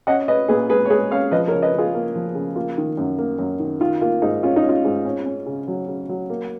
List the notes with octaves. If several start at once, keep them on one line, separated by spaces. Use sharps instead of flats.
C#4 D#5 F#5
C#4 B4 D#5
A#2 G#4 B4
G#3 G#4 B4
C#5
G#3 G#4 B4
C#4 C#5 F5
F3 B4 D#5
A#4 C#5
C#3
B4 D#5
C#3
F4 G#4
A#3
F3
C#3
A#3 F4
D#3
F#2
A#3
F#2
D#3
D#3 F4
A#3 F4
G#2 D#4
C#4 F4
D#4
C#4
F4
G#2
C#4
C#4
C#3
F#3
C#3
F#3
A#3